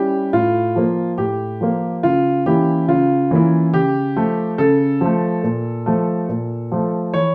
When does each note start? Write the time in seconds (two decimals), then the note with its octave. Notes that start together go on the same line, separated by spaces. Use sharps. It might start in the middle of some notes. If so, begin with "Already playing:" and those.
Already playing: G3 C#4 E4 G4
0.33 A2 F4
0.76 F3 A#3
1.18 A2 G4
1.61 F3 A#3
2.03 C#3 F4
2.46 E3 A#3 C#4 E4 G4
2.88 C#3 F4
3.31 E3 A#3 C#4 E4
3.73 C#3 G4
4.16 F3 A3
4.58 C#3 A4
5.01 F3 A3
5.44 A#2
5.86 F3 A3
6.29 A#2
6.72 F3 A3
7.14 E3 C#5